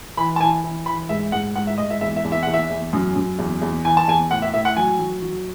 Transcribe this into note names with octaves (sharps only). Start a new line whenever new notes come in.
E3 B5
A5
E3 G#5
E3
E3 B5
G#2 E5
G#2 F#5
G#2 F#5
E5
G#2 D#5
E5
E2 E5
E5
E2
E5
E2 F#5
E5
E2
F#2
F#2
E2
E2
E3 G#5
A5
E2 G#5
A2 F#5
E5
A2 E5
F#5
F#3 G#5
F#3
F#3